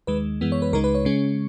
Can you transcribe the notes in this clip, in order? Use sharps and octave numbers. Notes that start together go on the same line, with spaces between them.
D#2 D#3 G#3 B4
F#2 E3 G#3 B3
C#5
B4
C#2 C#3 G#3 D#4 A#4
B4
C#5
C#3 G#3 C#4